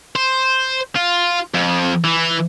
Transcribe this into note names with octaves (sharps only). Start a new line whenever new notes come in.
C5
F4
F2
E3